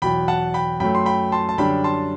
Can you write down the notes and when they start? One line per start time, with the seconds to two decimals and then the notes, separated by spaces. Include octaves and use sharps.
0.02 E2 B2 F#3 G5 B5
0.28 F#5 A5
0.54 G5 B5
0.80 F#2 F#3 A3 G5 B5
0.95 C6
1.06 G5 B5
1.32 A5 C6
1.49 A5
1.58 F#2 D3 G3 D4 G5 B5
1.84 A5 C6